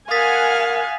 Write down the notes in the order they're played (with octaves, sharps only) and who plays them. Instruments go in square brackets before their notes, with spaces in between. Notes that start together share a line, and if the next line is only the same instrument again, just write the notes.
[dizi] A#4 [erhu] F5 [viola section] F#5 G#5 [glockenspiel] D#6 A6 B6